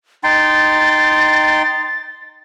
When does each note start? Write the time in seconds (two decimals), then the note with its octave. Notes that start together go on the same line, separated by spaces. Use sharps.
0.24 D#4 G5 C6 A6